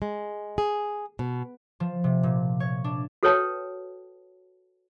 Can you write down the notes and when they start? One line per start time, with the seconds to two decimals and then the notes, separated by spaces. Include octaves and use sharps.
0.02 G#3
0.58 G#4
1.19 B2
1.80 F3
2.04 C3
2.23 A#2
2.60 C#5
2.84 D4
3.23 F#4 A4 B4 C#5 G5 A5